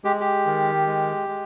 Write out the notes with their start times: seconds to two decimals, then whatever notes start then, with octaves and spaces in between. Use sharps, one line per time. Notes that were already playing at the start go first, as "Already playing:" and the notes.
0.04 G#3 G4
0.20 G4
0.46 D#3
0.87 G#3
1.28 G#3